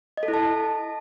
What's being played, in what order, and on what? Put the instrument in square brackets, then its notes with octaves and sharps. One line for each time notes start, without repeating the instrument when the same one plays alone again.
[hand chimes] D#5
A4
E4
A5